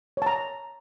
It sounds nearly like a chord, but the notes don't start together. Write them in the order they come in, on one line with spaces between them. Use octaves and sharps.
C#5 A5 A#5